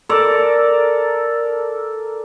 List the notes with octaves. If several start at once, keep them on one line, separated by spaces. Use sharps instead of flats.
A4 A#4 D5